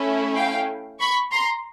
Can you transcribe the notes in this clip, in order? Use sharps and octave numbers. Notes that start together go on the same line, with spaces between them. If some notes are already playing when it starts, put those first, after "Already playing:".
Already playing: A3 C#4 E4
F5 G5
B5 C#6
A#5 C6